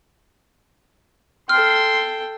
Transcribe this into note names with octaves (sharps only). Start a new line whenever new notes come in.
A4 G5 C6 F6